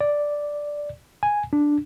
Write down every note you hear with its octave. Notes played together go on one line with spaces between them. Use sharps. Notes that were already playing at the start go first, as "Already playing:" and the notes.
D5
G#5
D4